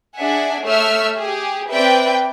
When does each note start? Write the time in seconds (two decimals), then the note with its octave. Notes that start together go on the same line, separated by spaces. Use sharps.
0.17 D4 G#4 E5 F#5 G#5
0.64 A3 C#5 E5 E6 F6
1.19 G4 G#4
1.72 C4 B4 D5 E5 G5